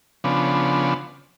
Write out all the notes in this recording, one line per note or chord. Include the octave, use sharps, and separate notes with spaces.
C#3 F3 B3 D4